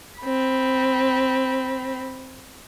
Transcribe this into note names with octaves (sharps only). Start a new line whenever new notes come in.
C4 B5